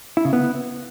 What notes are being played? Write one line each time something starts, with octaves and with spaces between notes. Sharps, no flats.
E4
C#3
B3